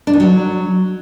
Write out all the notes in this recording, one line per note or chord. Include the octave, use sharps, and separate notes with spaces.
D4
D#3
F#3